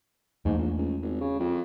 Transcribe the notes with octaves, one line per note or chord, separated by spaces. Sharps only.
E2 G#2 A3 A#3
A#1
C#2
G#1
C#3
F2